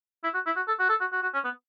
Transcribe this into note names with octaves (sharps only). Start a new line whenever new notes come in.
E4
F#4
E4
F#4
A4
F#4
A4
F#4
F#4
F#4
C#4
B3